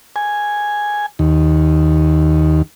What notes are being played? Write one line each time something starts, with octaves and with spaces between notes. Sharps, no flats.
G#5
D#2